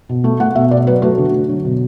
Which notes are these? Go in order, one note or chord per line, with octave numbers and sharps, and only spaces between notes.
B2
A3
A3 F#5
B2 E5
B2 D5
F#3 B4
A3 F#4
D3
D3
F#3
B2